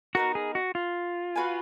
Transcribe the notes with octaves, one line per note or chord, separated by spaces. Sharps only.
B3 D#4 F#4 A#4
G#4
F#4
F4
F#4 B4 F5 G#5